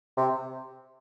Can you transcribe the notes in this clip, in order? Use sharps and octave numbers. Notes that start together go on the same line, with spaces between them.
C3